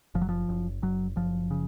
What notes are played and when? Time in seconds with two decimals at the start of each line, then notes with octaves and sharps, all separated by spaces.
0.15 F#1 F3
0.22 F#3
0.29 F3
0.49 F#1
0.82 F#1 F#3
1.16 F#1 F3
1.51 C#3